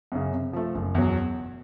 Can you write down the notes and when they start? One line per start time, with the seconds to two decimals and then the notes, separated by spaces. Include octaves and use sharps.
0.12 F#2 C#3
0.32 C3
0.53 F3 A3
0.75 F#1
0.95 E2 B2 F#3